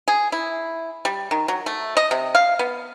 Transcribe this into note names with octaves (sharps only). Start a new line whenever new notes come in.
G#4
E4
G3
D#3
F#3
A3
D#5
C3
F5
B3